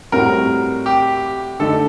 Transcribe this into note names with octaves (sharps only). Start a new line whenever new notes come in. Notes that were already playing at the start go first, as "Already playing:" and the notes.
A2 G3 C4 F#4 A#4
G4
D3 A3 D#4 A4